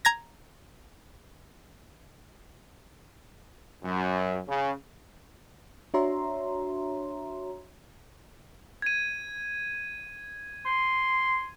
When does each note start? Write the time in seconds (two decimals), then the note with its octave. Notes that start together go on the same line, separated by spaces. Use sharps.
0.05 A#5 G#6 A#6
3.83 F#2
4.48 C#3
5.94 D4 F#4 C#5 E5 A#5 C6
8.82 G#6 D#7
10.66 C6